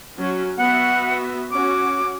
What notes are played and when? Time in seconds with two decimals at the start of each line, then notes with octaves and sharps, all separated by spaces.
0.16 F#3 C#4
0.58 B3 F#4 E5 F#5
1.51 C#4 F#4 D6